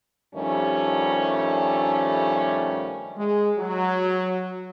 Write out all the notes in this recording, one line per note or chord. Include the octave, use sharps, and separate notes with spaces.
G2 D#3 F3 G3 A3 C#4
G#3
F#3